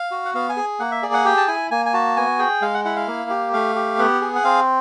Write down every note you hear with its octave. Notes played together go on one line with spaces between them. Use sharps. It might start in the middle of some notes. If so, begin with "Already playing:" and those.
Already playing: F5
F#4
F#5
B3 F5
G#5
G#4
A#3 F#5
E5
G#4 D5
F#5
G4 G5
A5
E4 G#5
A#3 G#5
G#5
F#4 A5
B3 G#5
G#4 G5
G#3 F5
F#5
E4 F#5
F5
A#3
G4
A3 F5
G4
B3 F#5
G#4
F#5
C4 F5